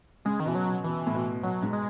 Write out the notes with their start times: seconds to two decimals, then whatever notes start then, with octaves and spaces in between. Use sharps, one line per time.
0.25 C#3 G#3
0.40 D#3
0.45 B2 E3
0.55 F#3
0.65 B2
0.84 B2 E3
1.07 A2
1.14 B2
1.43 B2 F#3
1.63 G#2
1.73 G#3